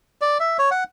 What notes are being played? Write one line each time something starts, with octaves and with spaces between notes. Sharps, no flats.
D5
E5
C#5
F#5